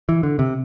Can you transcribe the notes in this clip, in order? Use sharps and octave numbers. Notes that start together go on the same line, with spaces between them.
E3
D3
C3